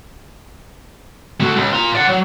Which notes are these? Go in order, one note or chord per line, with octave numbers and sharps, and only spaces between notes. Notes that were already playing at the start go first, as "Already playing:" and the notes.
A3 F#4
C#2
F4 A#5
D5 F#5
F#3